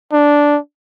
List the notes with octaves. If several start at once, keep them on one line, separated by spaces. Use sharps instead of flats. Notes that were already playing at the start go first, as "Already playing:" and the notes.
D4